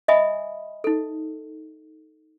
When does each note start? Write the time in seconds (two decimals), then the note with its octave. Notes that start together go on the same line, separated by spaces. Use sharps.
0.08 D#5 E5 G#5 B5 D#6
0.84 D#4 A4